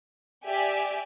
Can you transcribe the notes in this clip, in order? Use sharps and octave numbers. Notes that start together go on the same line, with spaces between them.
G4 D5 E5 G#5